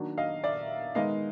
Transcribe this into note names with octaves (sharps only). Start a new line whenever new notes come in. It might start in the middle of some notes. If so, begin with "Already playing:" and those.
Already playing: D#3 F#3 A#3 D4
D#5 F5
D5 E5
D#3 G#3 B3 D#4 D#5 F5